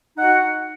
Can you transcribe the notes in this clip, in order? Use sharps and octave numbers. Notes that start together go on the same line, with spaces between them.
D#4 F#4 F#5